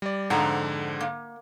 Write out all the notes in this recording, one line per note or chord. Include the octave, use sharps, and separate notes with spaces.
G3 D5
F2 G#2 D3 F#5 A#5
A#3